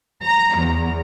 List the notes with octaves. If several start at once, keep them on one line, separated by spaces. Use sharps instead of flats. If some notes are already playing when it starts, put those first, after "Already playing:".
A#5
E2